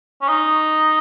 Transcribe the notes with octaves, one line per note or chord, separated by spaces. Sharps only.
C#4
D#4